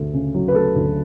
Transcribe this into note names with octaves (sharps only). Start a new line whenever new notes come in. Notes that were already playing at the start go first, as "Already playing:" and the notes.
Already playing: D2 A3
C#3
F#3
B4
A3 A4
D2